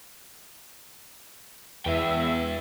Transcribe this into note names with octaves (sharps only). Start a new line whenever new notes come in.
E2 B4 E5 G5